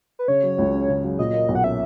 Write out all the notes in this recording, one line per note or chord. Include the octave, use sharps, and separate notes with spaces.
B4
C#3 C#5
F#3
C#2
C#4
C#3
F#3
A#2 D#5
A#3
B1
F#5
C#4 E5